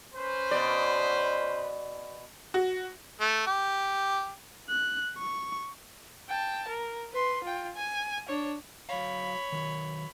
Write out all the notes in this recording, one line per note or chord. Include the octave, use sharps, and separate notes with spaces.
C#4 B4 C5
B2 D5
F#4
A3
G4
F#6
C#6
G5 A5
A#4
B4 C6
F4 G5
G#5
D4 C#5
F#3 C#5 F5 B5
D#3 F#3